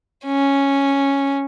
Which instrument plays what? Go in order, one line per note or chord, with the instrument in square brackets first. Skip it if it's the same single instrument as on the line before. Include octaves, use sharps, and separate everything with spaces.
[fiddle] C#4